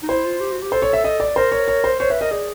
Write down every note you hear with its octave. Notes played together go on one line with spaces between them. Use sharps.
D#4
E4 C5
F4
G4
F#4
G4
A4 C5
C#5
E5
D#5
D5
A#4 C5
C#5
C#5
C5
C5 C#5
B4 E5
A#4 D#5
G#4 D5